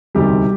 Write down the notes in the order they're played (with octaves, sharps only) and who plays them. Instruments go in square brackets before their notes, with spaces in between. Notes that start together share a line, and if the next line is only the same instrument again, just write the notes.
[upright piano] E1 D2 C3 D#3 G3 G4